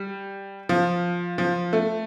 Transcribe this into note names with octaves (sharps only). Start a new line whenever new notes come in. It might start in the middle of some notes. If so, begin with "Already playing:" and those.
Already playing: G3
F3
F3
A3